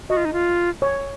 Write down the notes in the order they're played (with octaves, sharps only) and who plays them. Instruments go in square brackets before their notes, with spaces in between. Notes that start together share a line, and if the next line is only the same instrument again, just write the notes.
[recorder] F#4 [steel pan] D#5
[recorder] F4
D#4
F4
[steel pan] C#5